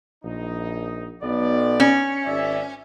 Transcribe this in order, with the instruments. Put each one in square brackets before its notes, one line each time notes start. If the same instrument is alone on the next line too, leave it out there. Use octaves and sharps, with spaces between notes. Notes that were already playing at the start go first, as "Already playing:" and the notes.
[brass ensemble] A#1 D#4
B1 B3 D5
[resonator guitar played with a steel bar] C#4
[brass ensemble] G#1 D5 E5